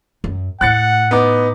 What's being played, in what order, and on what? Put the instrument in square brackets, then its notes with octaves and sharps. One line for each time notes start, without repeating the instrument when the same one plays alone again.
[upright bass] F#2
[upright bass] A2 [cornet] F#5 [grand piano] F#6 A6 C#7
[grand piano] B3 D#4 D6